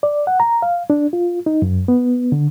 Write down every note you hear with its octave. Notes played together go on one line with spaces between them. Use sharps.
D5
F#5
A#5
F5
D4
F4
D#4
F#2
B3
D3